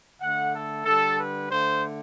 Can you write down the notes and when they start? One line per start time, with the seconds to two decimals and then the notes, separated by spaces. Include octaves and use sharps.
0.21 D3 A3 F#5
0.53 A4
0.85 D3 G3 A4
1.17 B4
1.49 D3 A3 C5